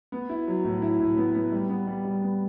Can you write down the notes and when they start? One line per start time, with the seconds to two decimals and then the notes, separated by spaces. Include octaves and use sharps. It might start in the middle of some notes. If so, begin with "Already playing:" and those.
0.12 B3
0.29 E4
0.48 F#3
0.64 A2
0.82 E4
1.00 A2
1.17 B3
1.35 B3
1.52 G3
1.69 B3
1.87 G3
2.04 G3
2.22 B3